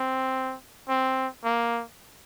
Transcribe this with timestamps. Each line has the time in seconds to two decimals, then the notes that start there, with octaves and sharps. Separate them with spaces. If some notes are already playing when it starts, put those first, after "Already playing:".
Already playing: C4
0.89 C4
1.44 A#3